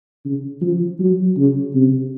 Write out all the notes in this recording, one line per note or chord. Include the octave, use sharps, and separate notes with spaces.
C#3
F3
F#3
C#3
C3